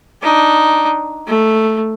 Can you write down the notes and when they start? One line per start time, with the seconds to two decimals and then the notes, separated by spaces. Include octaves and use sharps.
0.22 D4 D#4
1.27 A3